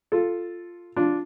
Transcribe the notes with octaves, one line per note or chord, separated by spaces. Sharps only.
F4 A4
D4 F4